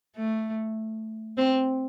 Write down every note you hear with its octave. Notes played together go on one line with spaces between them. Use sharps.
A3
C4